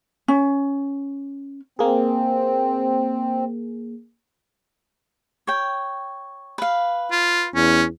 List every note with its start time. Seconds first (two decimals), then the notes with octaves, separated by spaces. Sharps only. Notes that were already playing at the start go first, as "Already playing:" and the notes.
0.28 C#4
1.79 A#3 C4 G#4
5.47 C#5 G5
6.58 B4 F5
7.11 F4
7.55 E2 C#4